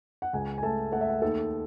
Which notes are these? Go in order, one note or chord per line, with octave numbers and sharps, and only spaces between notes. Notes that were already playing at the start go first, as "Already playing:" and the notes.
F#5
C#2 G#5
G#5
A3 A5
A3 F#5
E5
F#5
D#2 A4